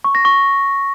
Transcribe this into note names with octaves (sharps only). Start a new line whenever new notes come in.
C#6
A#6
C#6